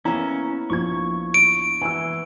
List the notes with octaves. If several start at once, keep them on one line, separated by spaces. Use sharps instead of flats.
A#3 B3 C#4 E4 A#5
A#1 F3 C#6 G#6
D7
E3 G#5 E6